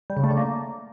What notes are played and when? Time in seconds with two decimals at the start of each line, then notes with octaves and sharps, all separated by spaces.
0.10 G3
0.17 C#3
0.24 A3
0.31 D3
0.37 A#3